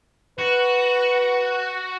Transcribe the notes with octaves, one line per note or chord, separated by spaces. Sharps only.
F#4 B4